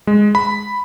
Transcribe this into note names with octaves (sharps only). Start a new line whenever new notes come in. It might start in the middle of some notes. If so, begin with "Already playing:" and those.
G#3
B5